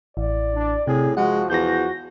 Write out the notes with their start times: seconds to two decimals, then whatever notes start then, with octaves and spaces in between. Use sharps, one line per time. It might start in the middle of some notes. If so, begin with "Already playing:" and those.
0.17 A1 D5
0.55 D4
0.87 A2 C3 G#4
1.17 F3 G#3 F#4 F#5
1.50 E2 F#4 G6 A#6